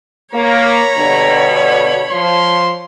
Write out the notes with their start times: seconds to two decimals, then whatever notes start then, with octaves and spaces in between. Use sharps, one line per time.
0.34 A#3 C#5 A#5 B5
0.97 G2 B2 D3
2.11 F3 C6